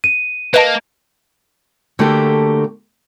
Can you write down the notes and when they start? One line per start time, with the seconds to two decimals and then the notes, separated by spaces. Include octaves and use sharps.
0.04 D#7
0.54 A#3 B4 D#5 A5
1.99 D3 A3 A#3 F#4 G4